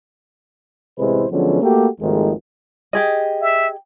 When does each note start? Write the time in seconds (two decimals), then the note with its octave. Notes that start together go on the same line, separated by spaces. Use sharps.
0.98 A1 C3 G#3 E4 B4 C5
1.31 D3 F3 F#3 G#3 B3 C#4
1.62 A3 A#3 F#4 G4
2.01 G#1 D#2 D#3 F3 G#3 A3
2.93 G4 G#4 D#5
3.41 E5